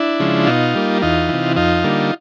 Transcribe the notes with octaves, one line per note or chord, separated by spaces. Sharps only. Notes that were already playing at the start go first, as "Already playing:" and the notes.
Already playing: D4 E4
C#3 F3 G#3
B2 D#4 F4
G3 A#3
E2 D#4 F4
C3 E3
F2 D#4 F4
D3 G3 A#3